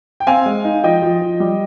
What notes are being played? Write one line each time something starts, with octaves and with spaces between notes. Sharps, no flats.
G5
C4 F5 G#5
G#3
D#4
F3 D#5 G5
F3
F3
G3